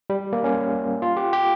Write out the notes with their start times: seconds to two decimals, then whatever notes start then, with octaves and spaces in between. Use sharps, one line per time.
0.10 G3
0.33 A#3
0.44 C#4
1.02 F4
1.17 G4
1.33 G4